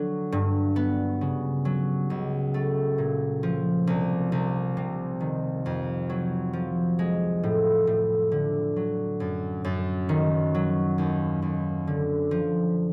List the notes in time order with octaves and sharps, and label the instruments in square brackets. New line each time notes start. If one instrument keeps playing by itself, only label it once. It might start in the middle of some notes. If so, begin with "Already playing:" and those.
Already playing: [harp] D3 F#3
G2
B3
C#3
F#3
C#2
A3
A#2
F3
C2
C2
C3
D#3
F2
F#3
F3
G#3
A2
A2
D3
F#3
F#2
F#2
D#3
F#3
D#2
D#2
D3
F3